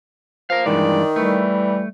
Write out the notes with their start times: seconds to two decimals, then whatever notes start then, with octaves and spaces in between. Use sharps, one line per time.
0.50 F3 A#4 F5
0.66 G2 D#3 E3 G#3 D5
1.16 E3 G3 A3